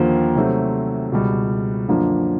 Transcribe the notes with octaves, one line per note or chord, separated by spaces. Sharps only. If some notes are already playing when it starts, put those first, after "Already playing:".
Already playing: D#2 D3 F3 A#3
C3 D#3 F#3 A3 C4
C#2 B2 G3
F#2 D3 F3 A#3 D4